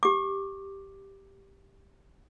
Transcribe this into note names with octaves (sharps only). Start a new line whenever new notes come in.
G4 D6